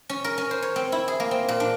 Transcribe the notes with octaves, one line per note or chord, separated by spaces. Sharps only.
C#4
A#4
C#4
C5
C#5
C4
E4
G#4
A#3
C4
A#2
D4